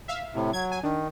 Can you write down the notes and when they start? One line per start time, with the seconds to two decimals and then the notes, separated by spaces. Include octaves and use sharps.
0.08 E5 F5
0.34 A2 C3
0.53 F#3 G#6
0.71 G#5
0.83 D#3 D4